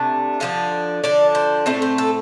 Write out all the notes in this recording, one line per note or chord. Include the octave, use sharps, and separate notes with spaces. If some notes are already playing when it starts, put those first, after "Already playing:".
Already playing: C3 A3 D4
D3 F3 D4 F5
D3 F3 D4 D5
C5
A2 A3 C4 A4
C5
A4